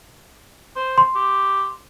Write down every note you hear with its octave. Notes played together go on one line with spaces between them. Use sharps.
C5
C6
G4